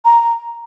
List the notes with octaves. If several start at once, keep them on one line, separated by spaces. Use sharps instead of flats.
A#5